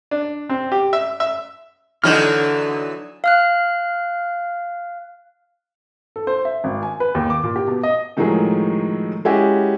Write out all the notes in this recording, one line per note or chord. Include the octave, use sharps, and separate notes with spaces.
D4
C4
G4
E5
E5
D3 E3 F#3 D#4 F6 G6
F5 F6 F#6
A4
C5
E5
G#1
G#5
B4
D#2
D6
A#2
G4
B2
D#5
A2 D#3 F3 F#3 G#3
G#3 C#4 E4 F#4 G4